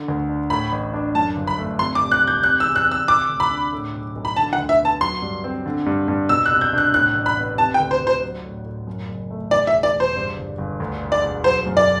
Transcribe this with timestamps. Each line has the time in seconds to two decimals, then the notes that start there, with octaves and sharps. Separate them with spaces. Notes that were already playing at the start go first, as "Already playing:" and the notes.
Already playing: D3
0.08 D2
0.29 D4
0.50 A2 B5
0.72 A1
0.94 D4
1.15 F#2 A5
1.36 G1
1.47 B5
1.58 A3
1.79 C3 C6
1.95 D6
2.01 C2
2.11 F#6
2.22 C2
2.27 G6
2.43 C3 F#6
2.60 E6
2.65 E2
2.76 F#6
2.87 C4 E6
3.08 C3 D6
3.30 D2
3.40 B5
3.51 D4
3.73 A2
3.94 B1
4.15 B1
4.25 B5
4.36 D3 A5
4.53 F#5
4.58 D2
4.69 E5
4.80 B3 A5
5.01 F#3 C6
5.22 G2
5.44 C4
5.66 D3
5.86 G2
6.08 G2
6.29 B2 E6
6.46 F#6
6.51 C2
6.61 G6
6.73 D4 F#6
6.93 A2 F#6
7.15 A1
7.26 B5
7.37 B3
7.58 C3 A5
7.74 G5
7.80 D2
7.91 C5
8.01 D2
8.07 C5
8.22 F#3
8.44 A2
8.65 A2
8.87 F#2
9.09 F#1
9.31 A3
9.51 E2 D5
9.67 E5
9.73 E1
9.83 D5
9.95 E1
10.00 C5
10.16 G2
10.37 G1
10.58 G1
10.80 D2
11.01 E1
11.12 D5
11.23 E1
11.44 F#3 C5
11.66 F#2
11.77 D5